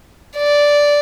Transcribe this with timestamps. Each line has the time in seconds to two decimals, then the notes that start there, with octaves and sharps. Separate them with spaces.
0.37 D5